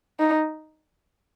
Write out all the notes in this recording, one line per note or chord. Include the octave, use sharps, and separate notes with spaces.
D#4